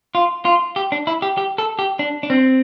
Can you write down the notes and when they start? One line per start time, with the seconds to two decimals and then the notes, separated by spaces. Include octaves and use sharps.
0.15 F4
0.45 F4
0.76 G4
0.92 D4
1.07 E4
1.22 G4
1.38 G4
1.58 A4
1.79 G4
1.99 D4
2.23 D4
2.30 C4